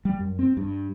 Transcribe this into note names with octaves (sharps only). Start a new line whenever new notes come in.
G3
F#2
C4
G2